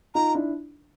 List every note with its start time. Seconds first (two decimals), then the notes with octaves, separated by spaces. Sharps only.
0.14 D#4 F4 A#5
0.35 D4 E4